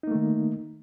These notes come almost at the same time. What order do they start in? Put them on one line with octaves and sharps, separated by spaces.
D#4 A#3 A3 D#3